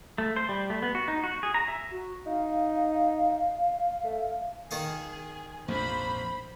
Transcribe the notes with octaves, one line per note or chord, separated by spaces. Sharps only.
A3
C5
G3
A3
B3
F#4
D#4
F#4
G#4
A#5
E5
F#4
D#4 F5
A3
D#3 G#4 D#5 F5
A#1 F2 G#2 C5 B5